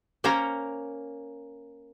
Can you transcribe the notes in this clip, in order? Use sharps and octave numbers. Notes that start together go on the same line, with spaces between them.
A#3 C#4 A#4 C5 C#5 A#5